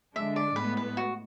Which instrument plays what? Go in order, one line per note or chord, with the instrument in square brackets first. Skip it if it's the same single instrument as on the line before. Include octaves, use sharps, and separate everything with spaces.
[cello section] D3 G#3 D4 [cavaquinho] E5
[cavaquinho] D5
[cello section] A2 G#3 B3 [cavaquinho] B4
[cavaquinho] B4
F#4